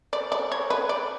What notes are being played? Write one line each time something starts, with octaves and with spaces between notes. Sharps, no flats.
D5
D5
C#5
B4
D5